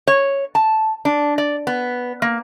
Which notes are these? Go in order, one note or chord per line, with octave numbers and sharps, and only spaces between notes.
C#5
A5
D4
D5
B3
A#3